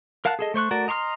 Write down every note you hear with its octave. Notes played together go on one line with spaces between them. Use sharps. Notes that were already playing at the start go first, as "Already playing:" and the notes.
A#4 F5 F#5 A5 F#6
G#4 A4 D#5
A3 C5 C#6 F#6
A3 F#4 A#4 D5
D#5 A#5 C6 C#6 F6